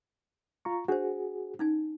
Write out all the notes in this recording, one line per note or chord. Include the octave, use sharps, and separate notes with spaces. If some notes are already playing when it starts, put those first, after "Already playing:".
F4 A#5 C#6
D4 F#4 G#4 C5
C#4 D#4 G#5